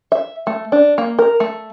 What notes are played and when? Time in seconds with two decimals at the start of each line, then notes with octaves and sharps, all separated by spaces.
0.12 E5
0.47 A3
0.72 D4
0.98 A#3
1.19 A#4
1.40 A3